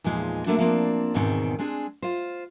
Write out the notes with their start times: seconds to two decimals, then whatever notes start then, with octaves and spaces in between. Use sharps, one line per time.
0.04 E2 A#2 F3 G#3 D#4
0.46 A3 A#3 C4 D4 F#4
0.58 F3 A#3 C4 D4
1.14 E2 G#2 B2 D#3 C4 C#4
1.59 G#3 C4 D4 G#4
2.02 F4 C5